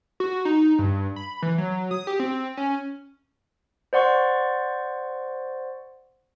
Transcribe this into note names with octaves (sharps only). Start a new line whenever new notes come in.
F#4
D#4
G2
B5
E3
F#3
D#6
G4
C4
C#4
C5 D5 F#5 C6 C#6